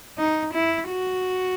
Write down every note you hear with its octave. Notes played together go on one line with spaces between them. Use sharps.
D#4
E4
F#4